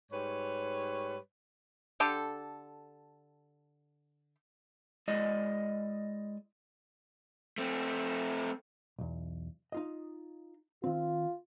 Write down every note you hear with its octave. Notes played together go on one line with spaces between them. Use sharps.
G#2 G3 B4 C#5
D3 G4 A4
G#3 E4 G#4 D5 D#5
A3 C4
B1 E2
D#4 F4 D#5
D#3 C4 F4